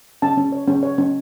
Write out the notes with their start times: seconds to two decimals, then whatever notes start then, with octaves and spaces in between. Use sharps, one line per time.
0.22 C#4 A5
0.37 C#4
0.52 C#5
0.68 C#4
0.83 C#5
0.98 C#4